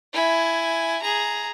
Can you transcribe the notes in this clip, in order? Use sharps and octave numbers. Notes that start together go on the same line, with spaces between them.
E4 G#5
G#4 A#5